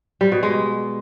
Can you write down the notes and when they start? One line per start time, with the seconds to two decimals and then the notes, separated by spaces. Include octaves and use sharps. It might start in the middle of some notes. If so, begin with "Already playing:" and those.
0.21 G3
0.32 B2
0.43 G#3